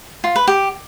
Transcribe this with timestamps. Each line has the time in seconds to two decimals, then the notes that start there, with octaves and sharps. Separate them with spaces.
0.24 F4
0.36 B4
0.48 G4